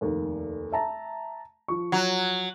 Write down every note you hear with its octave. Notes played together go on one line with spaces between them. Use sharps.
F1 D#2
E5 A5 A#5
F3 C#6
F#3